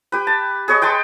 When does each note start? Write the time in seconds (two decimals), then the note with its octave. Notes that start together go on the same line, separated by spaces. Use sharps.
0.12 G4 B4
0.27 A5
0.68 G#4 B4 C#5 D#5
0.82 B4 G5 A5 C6